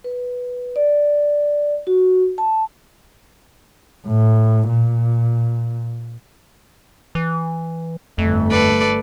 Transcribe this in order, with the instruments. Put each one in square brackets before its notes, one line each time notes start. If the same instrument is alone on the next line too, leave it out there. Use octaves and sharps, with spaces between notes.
[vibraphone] B4
D5
F#4
A5
[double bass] A2
A#2
[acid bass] E3
[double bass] G1 A3 [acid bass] F2
[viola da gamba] A4 B4 D5